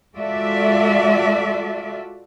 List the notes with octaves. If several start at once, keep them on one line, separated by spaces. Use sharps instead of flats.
G#3 F4 F#4 A4 D5 E5